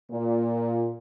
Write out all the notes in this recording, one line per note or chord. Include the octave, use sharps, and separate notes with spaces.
A#2